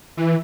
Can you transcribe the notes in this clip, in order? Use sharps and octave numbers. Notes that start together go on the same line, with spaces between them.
E3